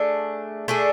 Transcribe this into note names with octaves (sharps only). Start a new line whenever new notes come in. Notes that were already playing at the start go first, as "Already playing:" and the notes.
Already playing: A3 D4 G#4
A3 D4 G#4